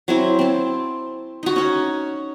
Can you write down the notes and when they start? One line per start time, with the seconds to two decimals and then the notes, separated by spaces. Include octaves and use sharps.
0.08 F#3 C4 E4
0.39 C4 A5
1.43 D#4 F#4
1.56 C#4 C#5